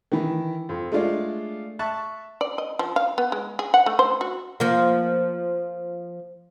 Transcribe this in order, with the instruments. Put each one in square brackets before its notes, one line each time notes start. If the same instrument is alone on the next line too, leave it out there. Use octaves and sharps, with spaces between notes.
[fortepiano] D#3 E3
F2
G#3 A3 D4 F4 D5
E5 A5 C#6 F#6
[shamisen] D5
D#5
F3
F5
B3
G#3
G#4
F#5
A3
C5
F#4
[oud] F3 A#3